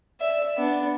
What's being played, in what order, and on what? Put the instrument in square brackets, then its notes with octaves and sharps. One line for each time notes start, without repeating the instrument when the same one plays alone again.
[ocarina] D5 [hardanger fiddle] E5
[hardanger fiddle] B3 D4